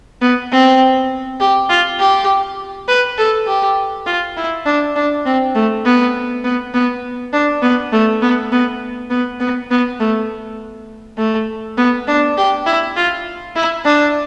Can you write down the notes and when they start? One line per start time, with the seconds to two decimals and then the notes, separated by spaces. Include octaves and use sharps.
0.22 B3
0.52 C4
1.40 G4
1.70 F4
2.00 G4
2.88 B4
3.18 A4
3.47 G4
4.07 F4
4.37 E4
4.66 D4
4.96 D4
5.26 C4
5.55 A3
5.85 B3
6.44 B3
6.74 B3
7.33 D4
7.63 B3
7.92 A3
8.22 B3
8.52 B3
9.10 B3
9.40 B3
9.71 B3
10.00 A3
11.18 A3
11.78 B3
12.08 D4
12.38 G4
12.66 E4
12.96 F4
13.56 E4
13.85 D4